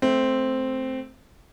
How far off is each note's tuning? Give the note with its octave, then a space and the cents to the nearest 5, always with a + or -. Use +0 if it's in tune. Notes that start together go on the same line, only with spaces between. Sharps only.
A3 -10 C4 +0